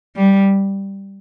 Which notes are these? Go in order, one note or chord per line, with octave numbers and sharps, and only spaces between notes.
G3